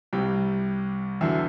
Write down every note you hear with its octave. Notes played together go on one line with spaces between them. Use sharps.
C2 C3 G3 G5
E2 D3 F#3 E5